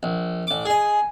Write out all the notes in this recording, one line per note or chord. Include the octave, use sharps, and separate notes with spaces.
A#1
A1 D6
G#4 D#5 G#5